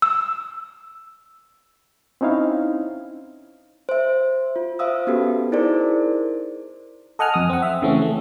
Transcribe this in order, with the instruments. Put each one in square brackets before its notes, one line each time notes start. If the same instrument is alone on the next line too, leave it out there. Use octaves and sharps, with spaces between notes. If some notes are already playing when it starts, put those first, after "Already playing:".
[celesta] E6
[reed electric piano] C4 C#4 D#4 E4 F5
[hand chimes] C5 E5
F4
C5 E5 F5 D#6 E6
B3 C#4 F#4 G4 A4 B4
D#4 E4 G#4 A#4 C5 D5
[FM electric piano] A4 D#5 F#5 G#5 F6
F2 D#6
C4 F#5
E5
C#3 E3 A3 C4 C#4
A3